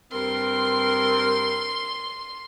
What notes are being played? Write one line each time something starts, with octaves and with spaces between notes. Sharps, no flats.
G2 C4 A#4 C6